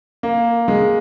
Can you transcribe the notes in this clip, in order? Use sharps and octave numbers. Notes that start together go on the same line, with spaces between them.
A#3
G#3